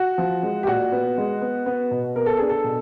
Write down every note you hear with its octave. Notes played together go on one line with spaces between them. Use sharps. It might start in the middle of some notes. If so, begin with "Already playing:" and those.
Already playing: F#4
F3
G#3
G4
A#2 F#4
B3
G#3
B3
B3
B2
B3 A#4
A4
D4 G#4
A4
B2